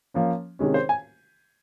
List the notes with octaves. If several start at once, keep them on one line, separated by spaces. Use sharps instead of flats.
F3 A#3 C#4
C3 D#3 G#3 C#4
C5
G#5